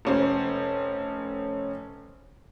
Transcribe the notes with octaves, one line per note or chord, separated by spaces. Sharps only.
F1 C#4 C5